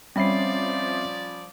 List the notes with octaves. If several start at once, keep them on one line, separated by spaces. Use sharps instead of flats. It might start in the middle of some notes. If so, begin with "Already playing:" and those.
F3 G3 C4 C#4 D5 E5 B5 C7